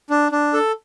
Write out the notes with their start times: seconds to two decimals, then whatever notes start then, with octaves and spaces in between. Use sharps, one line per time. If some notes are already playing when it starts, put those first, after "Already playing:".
0.10 D4
0.32 D4
0.53 A4